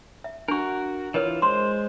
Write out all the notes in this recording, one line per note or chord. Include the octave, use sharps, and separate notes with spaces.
E5
D4 F#4 A#4 C#6
E3 F4 A#4 C#5 D#5 F6
G#3 C5 C6